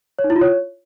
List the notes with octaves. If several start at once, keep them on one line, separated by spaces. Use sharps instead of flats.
C#5
D#4
E4
F4
C#5